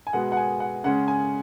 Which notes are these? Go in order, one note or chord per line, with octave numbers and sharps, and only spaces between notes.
G#5
B2 G#3 B3 F#5
F#5
G#5
F#5
C#3 G#3 C#4 F#5
G#5